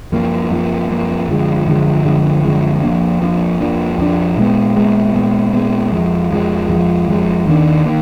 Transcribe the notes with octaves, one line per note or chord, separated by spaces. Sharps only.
F#2 F3 A#3
F#2 F3 A#3
F#2 F3 A#3
F#2 D3 F3 G#3
F#2 D3 F3 G#3
F#2 D3 F3 G#3
F#2 D3 F3 G#3
F2 F3 A#3 D4
F2 F3 A#3 D4
F2 F3 A#3 D4
F2 F3 A#3 D4
A#2 G#3 B3
A#2 G#3 B3
A#2 G#3 B3
A#2 G#3 B3
F2 F3 G#3
F2 F3 G#3
F2 F3 G#3
F2 F3 G#3
D#2 D#3 A#3 D4
D#3 A#3